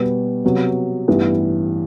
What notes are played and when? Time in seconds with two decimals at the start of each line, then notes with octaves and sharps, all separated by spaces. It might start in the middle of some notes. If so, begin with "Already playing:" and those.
Already playing: B2 G3 B3 F#4 B4
0.44 C3 F#3 B3
1.08 A1 G2 E3 B3 E4